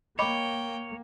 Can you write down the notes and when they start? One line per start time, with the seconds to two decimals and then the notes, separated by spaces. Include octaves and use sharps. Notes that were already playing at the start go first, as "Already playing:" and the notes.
0.19 A#3 C#5 D#5 G5 B5 D6